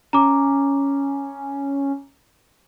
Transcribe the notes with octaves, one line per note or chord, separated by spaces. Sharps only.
C#4 A#5 D6